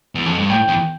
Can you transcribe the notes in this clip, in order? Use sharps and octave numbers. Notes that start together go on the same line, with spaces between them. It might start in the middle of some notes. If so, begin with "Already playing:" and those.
E2
F2
G2
A2 G5
E2